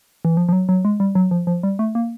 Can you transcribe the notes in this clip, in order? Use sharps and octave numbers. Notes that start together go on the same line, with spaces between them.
E3
F3
F3
F#3
F#3
G#3
G3
F#3
F3
F3
G3
A3
A#3